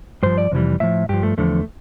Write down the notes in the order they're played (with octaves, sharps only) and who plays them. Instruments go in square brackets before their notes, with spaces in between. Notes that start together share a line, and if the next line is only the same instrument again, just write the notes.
[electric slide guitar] G2 F3 C5
D5
F2 C3 E3 G3
A2 F3 E5
G2 F3 G4
A3
E2 D3 F3 A3